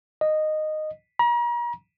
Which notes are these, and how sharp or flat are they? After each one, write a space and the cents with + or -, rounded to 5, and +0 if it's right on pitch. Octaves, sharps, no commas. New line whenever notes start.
D#5 -10
A#5 +40